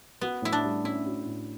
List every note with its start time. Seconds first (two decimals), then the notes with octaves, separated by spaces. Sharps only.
0.21 B3 F#4
0.42 A2 E4
0.52 D4
0.64 G3
0.84 C#4 E4
1.06 F#4
1.26 A2